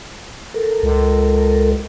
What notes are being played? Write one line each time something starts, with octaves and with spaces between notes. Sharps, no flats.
A4 A#4
C#2